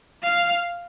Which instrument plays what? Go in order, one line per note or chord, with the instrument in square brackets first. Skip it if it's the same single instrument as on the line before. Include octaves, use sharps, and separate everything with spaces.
[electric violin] F5